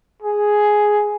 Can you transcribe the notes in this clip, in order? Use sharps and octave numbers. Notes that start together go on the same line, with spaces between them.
G#4